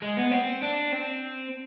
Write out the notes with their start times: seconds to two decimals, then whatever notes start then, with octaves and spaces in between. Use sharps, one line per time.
0.02 G#3
0.17 B3
0.31 C4
0.63 D4
0.93 C4